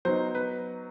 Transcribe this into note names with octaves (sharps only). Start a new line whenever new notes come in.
F#3 B3 D#4 C5
B4